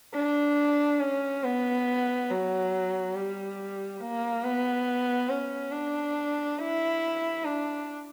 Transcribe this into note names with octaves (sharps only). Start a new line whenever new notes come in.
D4
C#4
B3
F#3
G3
A#3
B3
C#4
D4
E4
D4